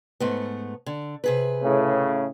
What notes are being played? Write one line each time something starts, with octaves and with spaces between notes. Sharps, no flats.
G#2 A3 B3
D3
C3 G#4 B4
A2 C#3